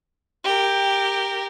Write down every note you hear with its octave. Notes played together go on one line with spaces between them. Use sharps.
G4 A#4